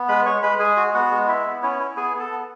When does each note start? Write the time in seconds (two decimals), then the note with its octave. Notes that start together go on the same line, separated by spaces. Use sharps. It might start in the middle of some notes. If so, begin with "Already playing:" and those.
Already playing: B3
0.08 G#3 B4 B5
0.26 G#3 C#5 C#6
0.42 G#3 B4 B5
0.59 G#3 G#4 G#5
0.77 F#4
0.94 B3 F#4 F#5
1.11 G#3
1.28 E4 E5
1.46 B3
1.62 C#4 E4 C#5
1.80 E4
1.96 B3 G#4 G#5
2.15 B3 A4 A5
2.31 B3